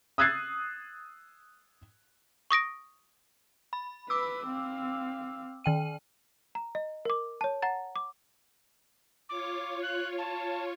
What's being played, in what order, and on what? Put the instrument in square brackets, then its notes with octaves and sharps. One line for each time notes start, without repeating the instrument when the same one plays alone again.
[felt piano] D#6 E6 F#6 G#6 A6 C7
[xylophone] C#6 D#6 A#6 D7
[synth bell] B5
[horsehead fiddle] B4 [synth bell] D6 E6
[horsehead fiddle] C4 F5
[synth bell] D#3 G5 D#7
[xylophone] A#5
D#5
A#4 D6
C#5 A5
F#5 A#5 A6
D6
[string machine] F4 C#5 [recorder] D6
[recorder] F#6
A5